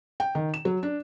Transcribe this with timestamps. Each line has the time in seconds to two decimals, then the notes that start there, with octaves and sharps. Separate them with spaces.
0.20 G5
0.35 D#3
0.54 E7
0.65 F#3
0.83 D4